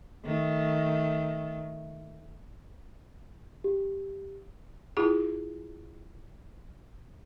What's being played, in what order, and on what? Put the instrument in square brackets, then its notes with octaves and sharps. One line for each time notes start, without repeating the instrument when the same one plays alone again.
[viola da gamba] D#3 A3
[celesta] G4
[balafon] E4 F4 G#4